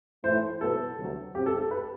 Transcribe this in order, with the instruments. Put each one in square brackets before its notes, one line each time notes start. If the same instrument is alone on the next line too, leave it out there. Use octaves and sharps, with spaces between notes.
[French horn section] A2 E3 A3 E4 [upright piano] C5
[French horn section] B2 F#3 B3 E4 B4 [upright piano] A4
[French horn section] D2 C3 F#3
[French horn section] C3 F#3 C4 [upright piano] G4
[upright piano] A4
A4
B4